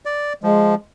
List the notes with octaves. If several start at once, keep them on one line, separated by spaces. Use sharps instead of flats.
D5
F3 G#3